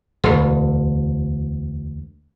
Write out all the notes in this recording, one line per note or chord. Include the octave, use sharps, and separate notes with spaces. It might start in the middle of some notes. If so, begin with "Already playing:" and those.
E1 D2